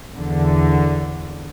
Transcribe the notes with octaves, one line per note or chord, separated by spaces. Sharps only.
E2 D3